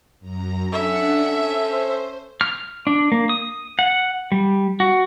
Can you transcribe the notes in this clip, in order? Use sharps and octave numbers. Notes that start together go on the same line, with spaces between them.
F#2 A#5
C#4 D4 A4 E5 F#5 C#7
C5
F6
D4
A#3
D#6
F#5
G3
F#4